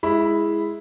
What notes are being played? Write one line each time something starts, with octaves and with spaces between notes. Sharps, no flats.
G#3 E4 B5